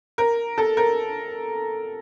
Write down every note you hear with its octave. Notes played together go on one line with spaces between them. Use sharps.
A#4
A4
A#4